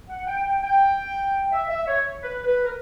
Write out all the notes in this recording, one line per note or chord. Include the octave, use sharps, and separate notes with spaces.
F#5
G5
G5
G5
E5
E5
C#5
B4
B4
A#4